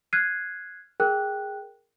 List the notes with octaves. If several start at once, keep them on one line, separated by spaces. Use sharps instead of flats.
F6 F#6 G#6 C7 D#7
G#4 A#4 G5 F#6